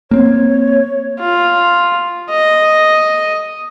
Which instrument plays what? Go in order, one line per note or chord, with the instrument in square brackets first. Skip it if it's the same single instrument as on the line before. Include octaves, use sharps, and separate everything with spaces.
[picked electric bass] A#3 C4 [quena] C#5
[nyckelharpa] F4
D#5